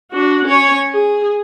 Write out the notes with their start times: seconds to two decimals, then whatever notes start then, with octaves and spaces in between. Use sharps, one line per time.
0.11 D4 F#4
0.45 C#4 C#5
0.90 G#4